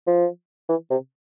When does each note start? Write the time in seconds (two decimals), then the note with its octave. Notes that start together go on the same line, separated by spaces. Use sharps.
0.07 F3
0.69 E3
0.90 C3